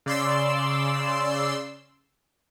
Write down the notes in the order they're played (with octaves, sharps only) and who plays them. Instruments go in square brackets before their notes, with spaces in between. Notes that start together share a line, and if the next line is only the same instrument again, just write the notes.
[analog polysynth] C#3 D5 C6 E6